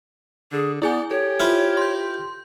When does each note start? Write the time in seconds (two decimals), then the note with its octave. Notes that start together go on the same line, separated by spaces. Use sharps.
0.52 D3 G#4
0.82 B3 E4 G#4 D5 G#5
1.11 G4 A4 C#5
1.40 E4 F4 C5 F6
1.77 C6 G6